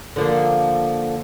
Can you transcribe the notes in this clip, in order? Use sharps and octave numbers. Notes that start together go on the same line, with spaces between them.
D3 F3 A#3